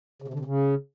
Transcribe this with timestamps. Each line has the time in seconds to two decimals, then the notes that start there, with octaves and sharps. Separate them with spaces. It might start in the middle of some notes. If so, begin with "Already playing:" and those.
0.22 C#3
0.28 C3
0.34 D3
0.39 C3
0.45 C#3